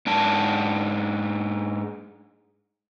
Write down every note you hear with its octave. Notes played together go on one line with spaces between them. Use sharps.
G#2 D4 A5